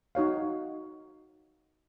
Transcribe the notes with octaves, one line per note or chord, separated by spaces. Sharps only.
D#4 F#4 C#5 F5